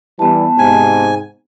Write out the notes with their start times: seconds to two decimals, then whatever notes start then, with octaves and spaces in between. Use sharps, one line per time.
0.19 E3 G3 B3 A5
0.59 G#2 C3 G#5